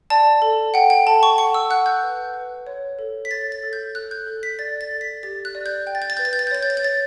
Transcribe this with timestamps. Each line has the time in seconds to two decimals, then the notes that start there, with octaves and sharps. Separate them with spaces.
0.10 D5 A5
0.42 A4
0.74 F#5 G5
0.90 G5
1.07 A4 A5
1.23 C#6
1.38 F#5 C#6
1.54 E6
1.70 F#5 F#6
1.86 G6
2.03 B4
2.34 B4
2.67 C#5
2.99 A4
3.25 B6
3.30 C#5 A6
3.52 A6
3.63 A4
3.73 G6
3.95 A4 F#6
4.11 G6
4.26 A4
4.43 B6
4.59 D5 A6
4.81 A6
4.91 A4
5.01 B6
5.23 G4 A6
5.45 F#6
5.55 D5
5.66 G6
5.87 G5 G6
5.95 A6
6.02 G6
6.10 A6
6.17 B4 G6
6.25 A6
6.33 G6
6.39 A6
6.47 G6
6.51 C#5 A6
6.63 G6
6.70 A6
6.77 G6
6.83 C#5 A6